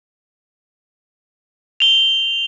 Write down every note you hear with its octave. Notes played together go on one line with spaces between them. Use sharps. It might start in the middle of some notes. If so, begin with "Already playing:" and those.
F7 G7